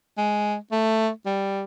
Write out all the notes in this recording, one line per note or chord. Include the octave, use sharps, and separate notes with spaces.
G#3
A3
G3